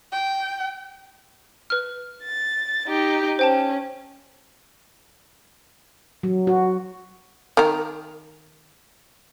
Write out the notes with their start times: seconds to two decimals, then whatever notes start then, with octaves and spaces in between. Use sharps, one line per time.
0.12 G5
1.70 B4 F6
2.24 A6
2.87 D#4 G4
3.39 C#4 C5 G5 A5
6.23 F#3
6.47 F#4
7.57 D#3 A#4